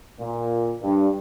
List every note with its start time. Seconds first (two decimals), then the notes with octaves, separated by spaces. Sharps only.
0.21 A#2
0.83 G2